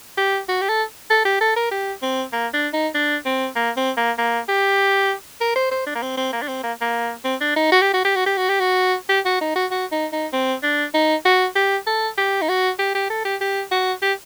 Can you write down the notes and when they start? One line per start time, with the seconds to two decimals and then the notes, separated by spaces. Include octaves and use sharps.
0.17 G4
0.49 F#4
0.62 G4
0.69 A4
1.10 A4
1.25 G4
1.41 A4
1.56 A#4
1.71 G4
2.02 C4
2.33 A#3
2.54 D4
2.73 D#4
2.95 D4
3.26 C4
3.56 A#3
3.77 C4
3.97 A#3
4.18 A#3
4.48 G4
5.41 A#4
5.56 C5
5.71 C5
5.86 D4
5.95 A#3
6.02 C4
6.17 C4
6.33 A#3
6.42 D4
6.48 C4
6.63 A#3
6.81 A#3
7.25 C4
7.41 D4
7.56 D#4
7.72 F#4
7.82 G4
7.94 F#4
8.05 G4
8.16 F#4
8.26 G4
8.38 F#4
8.49 G4
8.60 F#4
9.09 G4
9.25 F#4
9.41 D#4
9.56 F#4
9.71 F#4
9.92 D#4
10.12 D#4
10.33 C4
10.63 D4
10.94 D#4
11.25 F#4
11.55 G4
11.87 A4
12.17 G4
12.42 D#4
12.49 F#4
12.79 G4
12.95 G4
13.10 A4
13.25 G4
13.41 G4
13.71 F#4
14.02 G4